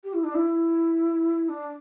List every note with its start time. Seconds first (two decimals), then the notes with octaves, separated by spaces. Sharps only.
0.04 G4
0.14 E4
0.24 D4
0.35 E4
1.49 D4